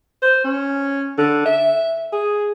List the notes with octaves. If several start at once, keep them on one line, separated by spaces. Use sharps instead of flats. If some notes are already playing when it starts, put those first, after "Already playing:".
C5
C#4
D3
E5
G#4